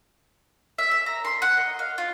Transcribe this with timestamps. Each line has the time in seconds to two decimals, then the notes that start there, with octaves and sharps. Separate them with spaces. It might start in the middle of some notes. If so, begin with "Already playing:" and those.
0.78 E5
0.91 E5
1.06 A#5
1.25 C6
1.42 F#5
1.57 D#5
1.79 F5
1.98 F4